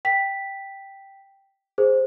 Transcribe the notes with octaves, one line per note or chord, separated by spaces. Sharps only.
G5 B6
G#4 C5